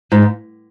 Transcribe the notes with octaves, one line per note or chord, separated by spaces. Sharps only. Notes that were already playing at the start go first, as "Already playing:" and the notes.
G#2